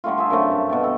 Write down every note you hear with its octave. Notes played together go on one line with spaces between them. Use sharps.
D3 G3 A3 F4
F4 G#4 A4 E5
F#2 C3 A3 A5
G2
B2 D5 G5
A4